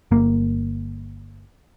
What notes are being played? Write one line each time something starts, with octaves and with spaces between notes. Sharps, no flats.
G1 A#3